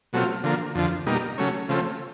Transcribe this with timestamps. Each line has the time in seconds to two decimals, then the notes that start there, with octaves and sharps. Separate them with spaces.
0.13 B2 F#3 A3 C4 F4
0.44 D3 F3 A#3
0.75 F2 D3 F3
1.07 B2 G3 A#3 D#4
1.38 C#3 F#3 A3 C#4
1.69 C#3 F3 A3 C4